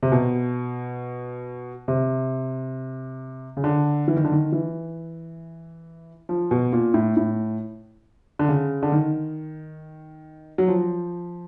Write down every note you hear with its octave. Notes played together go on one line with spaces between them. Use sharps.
C3
B2
C3
C#3
D3
E3
D#3
D3
D#3
E3
F3
B2
A#2
A2
A2
D3
C#3
D3
D#3
F#3
F3